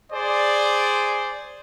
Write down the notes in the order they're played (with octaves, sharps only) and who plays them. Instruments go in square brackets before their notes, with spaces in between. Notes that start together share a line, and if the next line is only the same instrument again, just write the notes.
[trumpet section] G#4 C5 D5